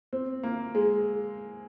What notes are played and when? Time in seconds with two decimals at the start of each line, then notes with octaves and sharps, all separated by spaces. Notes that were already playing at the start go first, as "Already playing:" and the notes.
0.13 C4
0.43 A#3
0.75 G#3